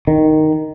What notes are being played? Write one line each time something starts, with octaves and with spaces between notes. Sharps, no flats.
D#3